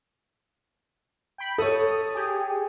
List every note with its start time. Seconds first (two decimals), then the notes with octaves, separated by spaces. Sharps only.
1.38 G5 B5
1.58 A4 C#5 D#6
2.15 G4 G#4